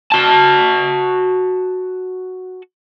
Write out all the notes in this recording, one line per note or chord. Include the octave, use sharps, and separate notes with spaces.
F#4 A5